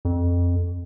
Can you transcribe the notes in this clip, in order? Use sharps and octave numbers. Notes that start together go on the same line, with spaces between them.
F2